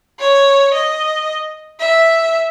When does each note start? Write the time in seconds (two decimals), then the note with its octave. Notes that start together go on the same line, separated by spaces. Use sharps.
0.20 C#5
0.73 D#5
1.80 E5